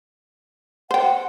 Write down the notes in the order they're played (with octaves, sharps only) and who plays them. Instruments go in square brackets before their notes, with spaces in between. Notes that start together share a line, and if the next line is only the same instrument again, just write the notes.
[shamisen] C5 G5 [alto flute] F#5